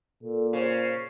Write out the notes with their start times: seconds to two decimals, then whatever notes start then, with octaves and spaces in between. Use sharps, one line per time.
0.22 A#2 A4
0.53 C#3 C5